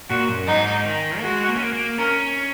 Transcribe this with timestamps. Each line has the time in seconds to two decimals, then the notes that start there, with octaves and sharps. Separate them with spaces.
0.10 A#2 F#4
0.29 F#2
0.47 G#2 D#4
0.85 D#3
1.19 A#3
1.23 G#3 F#4
1.48 A#3
1.55 C#4
1.63 A#3
1.73 A#3
1.98 C#4 A#4